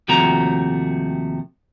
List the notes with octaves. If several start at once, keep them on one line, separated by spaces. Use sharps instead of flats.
D#2 C3 F3 A3 F#4 A#5